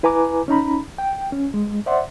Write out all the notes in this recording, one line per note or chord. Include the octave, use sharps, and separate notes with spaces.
E4 B4 G#5 A#5 D6
C#4 D#4 A#5 B5
G5
C#4
G#3
C5 D5 E5 F#5 C6